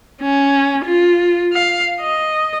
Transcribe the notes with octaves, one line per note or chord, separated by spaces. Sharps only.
C#4
F4
F5
D#5